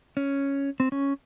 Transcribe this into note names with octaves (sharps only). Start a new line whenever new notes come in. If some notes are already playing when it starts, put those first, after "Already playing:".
C#4
C4
C#4